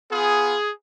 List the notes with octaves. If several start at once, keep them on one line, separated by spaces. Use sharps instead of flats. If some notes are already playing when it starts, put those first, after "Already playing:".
B3 F4 G#4